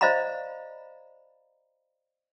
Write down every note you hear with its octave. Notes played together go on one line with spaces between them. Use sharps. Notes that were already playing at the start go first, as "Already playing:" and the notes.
C5 D5 D#5 F5 A#5 B5